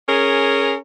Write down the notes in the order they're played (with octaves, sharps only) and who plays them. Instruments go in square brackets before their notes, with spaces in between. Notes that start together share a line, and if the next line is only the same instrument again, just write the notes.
[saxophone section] C#4 G#4 A#4